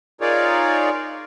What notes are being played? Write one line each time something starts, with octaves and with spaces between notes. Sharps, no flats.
D#4 F4 G#4 A#4 C#5 D5